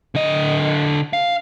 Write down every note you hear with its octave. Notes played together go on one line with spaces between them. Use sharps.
D3 D#5
F5